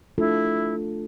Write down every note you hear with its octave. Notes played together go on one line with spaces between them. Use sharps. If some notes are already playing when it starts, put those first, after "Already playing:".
A3 D4 E4 F4 A4